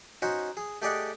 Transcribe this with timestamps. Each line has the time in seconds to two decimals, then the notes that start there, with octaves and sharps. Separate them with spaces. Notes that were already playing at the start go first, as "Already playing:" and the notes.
0.22 C#4 D#4 F#4 C5
0.57 G#4
0.82 A3 G4 G#4 D5 D#5 F#5